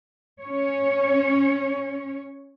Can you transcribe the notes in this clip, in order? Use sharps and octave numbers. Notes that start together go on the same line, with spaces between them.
C#4 C#5